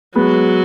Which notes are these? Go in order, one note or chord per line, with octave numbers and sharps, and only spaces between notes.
F#3 G#3 B3